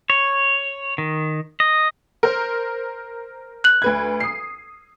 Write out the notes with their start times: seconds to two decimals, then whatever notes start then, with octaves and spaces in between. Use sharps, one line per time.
0.10 C#5
0.98 D#3
1.60 D#5
2.23 A#4 C5
3.64 F#6 F#7
3.82 D2 B4 G#6
4.20 D#6 C7